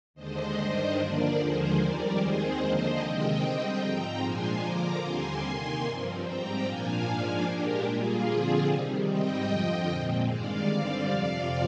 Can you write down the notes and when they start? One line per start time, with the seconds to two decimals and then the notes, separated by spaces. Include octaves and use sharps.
0.14 D#2 D3 G#3 D4 C5 D#5
0.55 G2 D#3 G3 D4
0.96 D3 F3 A#3 D4 A#4 D5
1.36 D#2 D3 F3 G#3 G#4 C5
1.76 F2 D#3 G3 A#4 D5
2.16 D#2 D#3 G#3 C4 G#4 C5
2.57 D3 F3 A#3 D4 C5 D#5
2.97 C3 D#3 G#3 C4 D#5 G5
3.38 D3 G3 C4
3.78 G#2 F3 C4 G5 A#5
4.19 A#2 F3 G#3 D4 G#5 C6
4.59 D3 F3 A#3 A#5 D6
5.00 D#2 D3 G3 C4 G#5 C6
5.40 C3 D#3 A#3
5.81 G2 F3 C4
6.21 G#2 G3 C4 G5 A#5
6.61 A#2 F3 A#3 D4 F5 G#5
7.02 G#2 F3 A#3 D4
7.42 A#2 G#3 D4 G4 A#4
7.83 A#2 G3 A#3 F4 G#4
8.23 D3 F3 C4 F4 G#4
8.64 C3 D#3 G3
9.04 G#2 G3 C4 D#5 G5
9.45 F2 D3 F3
9.85 A#2 G#3 C4
10.25 G2 D#3 G#3 D5 F5
10.66 D3 G3 C4 D5 F5
11.07 F2 C3 F3 D5 F5